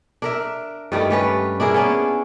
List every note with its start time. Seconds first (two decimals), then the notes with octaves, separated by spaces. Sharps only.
0.22 D4 A#4 E5
0.92 G2 D#3 G3 A3
1.10 G3 C#4 B4
1.60 D4 E4 G#4 A#4
1.74 B3 C#4 D4